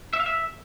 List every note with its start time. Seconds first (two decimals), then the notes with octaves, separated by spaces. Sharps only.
0.13 E5
0.20 F5
0.26 E5